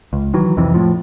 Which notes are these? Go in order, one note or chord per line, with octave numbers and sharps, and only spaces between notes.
C#2
D#3 E3 F#3
C2 F2 C3 E3
F2 A2 F3